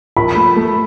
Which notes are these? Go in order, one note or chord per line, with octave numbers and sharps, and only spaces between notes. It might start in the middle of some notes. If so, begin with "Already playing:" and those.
F3 B5
A3
A3